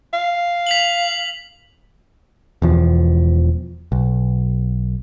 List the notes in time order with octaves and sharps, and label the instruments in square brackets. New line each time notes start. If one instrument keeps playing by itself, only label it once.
[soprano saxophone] F5
[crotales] B6 F7 F#7
[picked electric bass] E1 E2 F3
B1